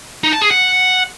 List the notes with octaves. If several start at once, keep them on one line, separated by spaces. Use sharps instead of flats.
D#4
A5
G#4
F#5